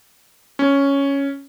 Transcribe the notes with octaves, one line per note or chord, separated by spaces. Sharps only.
C#4